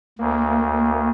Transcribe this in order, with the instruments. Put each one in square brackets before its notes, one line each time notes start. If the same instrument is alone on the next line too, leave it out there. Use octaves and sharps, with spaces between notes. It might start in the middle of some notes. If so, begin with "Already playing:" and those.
[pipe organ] D2 [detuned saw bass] A#3